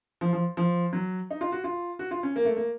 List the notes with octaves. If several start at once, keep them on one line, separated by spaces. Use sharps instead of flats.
F3
F3
F3
F#3
D#4
F4
F#4
F4
F#4
F4
C#4
A#3
A3
A#3